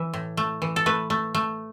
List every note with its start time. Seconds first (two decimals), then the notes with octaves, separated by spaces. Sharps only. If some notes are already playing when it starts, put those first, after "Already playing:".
Already playing: E3 E5
0.14 A2
0.37 A3
0.62 E3
0.76 A4
0.86 A3 B4
1.10 A3
1.35 A3